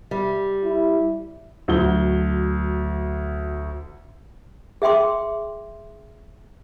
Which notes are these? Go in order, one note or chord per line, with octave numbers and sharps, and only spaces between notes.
G3
E4
D2 F#3 G7
G#4 E5 G5 C6 D6